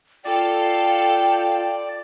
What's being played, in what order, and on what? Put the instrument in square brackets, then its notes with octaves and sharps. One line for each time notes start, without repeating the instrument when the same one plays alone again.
[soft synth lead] F4 [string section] A4 F5 [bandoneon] D5 [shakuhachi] G5